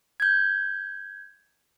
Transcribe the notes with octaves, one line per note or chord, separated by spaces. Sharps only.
G6 G#6